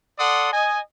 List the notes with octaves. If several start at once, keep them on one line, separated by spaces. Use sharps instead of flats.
A4 D5 F#5 C6 D#6
D#5 G#5